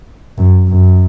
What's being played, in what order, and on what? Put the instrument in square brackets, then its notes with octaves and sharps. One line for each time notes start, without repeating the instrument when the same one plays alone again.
[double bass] F#2
F#2